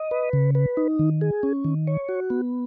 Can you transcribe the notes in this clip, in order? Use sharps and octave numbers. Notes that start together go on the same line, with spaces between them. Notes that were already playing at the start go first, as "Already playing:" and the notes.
Already playing: D#5
B4
C#3
B4
D#4
D#3
G#4
C#4
D#3
C#5
F#4
B3